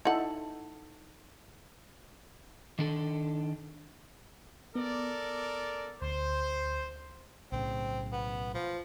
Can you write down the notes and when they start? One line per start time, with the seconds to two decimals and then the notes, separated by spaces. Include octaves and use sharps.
0.05 D#4 E4 A4 F#5
2.79 D#3 D4 A4
4.75 B3 A4 A#4 D5
6.02 D2 C5
7.52 B1 A2 C#3 C4
8.12 B3
8.54 F3